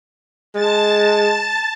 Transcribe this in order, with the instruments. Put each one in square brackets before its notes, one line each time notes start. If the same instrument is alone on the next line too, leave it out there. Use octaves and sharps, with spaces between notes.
[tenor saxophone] G#3 [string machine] A5 A6